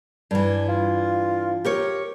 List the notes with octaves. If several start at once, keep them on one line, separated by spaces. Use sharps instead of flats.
G2 E3 D4
F4
G4 A#4 C#5